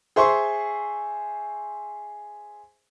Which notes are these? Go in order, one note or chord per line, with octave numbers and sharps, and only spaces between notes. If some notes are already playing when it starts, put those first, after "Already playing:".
G#4 C5 E5 C6 C#6